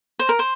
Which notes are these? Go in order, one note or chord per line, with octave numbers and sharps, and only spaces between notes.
C5
A#4
C5